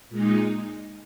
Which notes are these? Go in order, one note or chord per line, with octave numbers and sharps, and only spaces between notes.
A#2 G#3 D#4